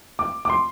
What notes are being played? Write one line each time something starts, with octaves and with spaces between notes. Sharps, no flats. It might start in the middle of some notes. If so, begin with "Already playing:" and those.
D6
D6
C6